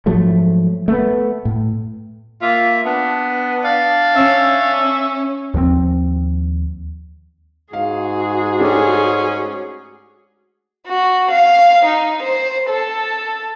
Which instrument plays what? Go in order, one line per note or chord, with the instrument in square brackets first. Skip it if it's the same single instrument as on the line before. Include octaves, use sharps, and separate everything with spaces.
[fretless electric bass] G#2 F3 F#3 A3
A3 B3
A2
[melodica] A#3 E5 [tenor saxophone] F4
[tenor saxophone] B3 [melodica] D4
[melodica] D4 D5 F5
[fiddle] C#4 [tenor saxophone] E5
[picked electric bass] D#2 F3 A#3 C4
[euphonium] G#2 [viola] F#4 G#4 [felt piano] F5
[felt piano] A3 D4 G4 [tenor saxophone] C#4
[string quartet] F#4
F5
D#4
C5
A4